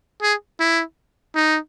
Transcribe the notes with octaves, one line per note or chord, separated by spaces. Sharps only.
G#4
E4
D#4